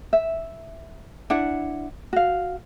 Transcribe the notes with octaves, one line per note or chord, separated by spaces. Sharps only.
E5
D4 E4 F#5
F#4 F5